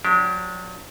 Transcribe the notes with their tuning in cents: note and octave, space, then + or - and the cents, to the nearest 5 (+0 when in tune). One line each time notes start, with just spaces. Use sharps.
F#3 -35 D4 -20 G4 -20